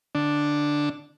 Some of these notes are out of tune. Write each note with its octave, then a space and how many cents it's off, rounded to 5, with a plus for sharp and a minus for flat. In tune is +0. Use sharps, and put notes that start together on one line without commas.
D3 +0 D4 +0